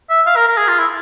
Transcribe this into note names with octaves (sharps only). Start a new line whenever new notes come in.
E5
F5
A#4
A#4
G#4
F4
E4